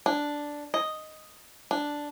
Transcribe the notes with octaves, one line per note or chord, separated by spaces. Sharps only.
D4
D#5
D4